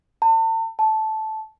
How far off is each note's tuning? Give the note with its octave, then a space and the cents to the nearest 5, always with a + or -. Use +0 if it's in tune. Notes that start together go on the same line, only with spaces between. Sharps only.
A5 +40
A5 -10